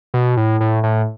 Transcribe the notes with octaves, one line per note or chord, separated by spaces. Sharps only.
B2
A2
A2
A2